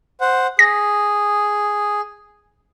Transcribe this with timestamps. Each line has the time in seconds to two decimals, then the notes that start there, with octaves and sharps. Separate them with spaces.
0.21 C5 F#5
0.59 G#4 A#6